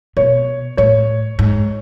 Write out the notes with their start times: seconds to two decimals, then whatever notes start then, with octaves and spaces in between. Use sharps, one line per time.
0.17 B2 C#5
0.77 A2 C#5
1.39 G#2